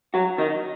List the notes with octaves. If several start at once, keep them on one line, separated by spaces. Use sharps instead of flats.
F#3 F#4
D#3 D#4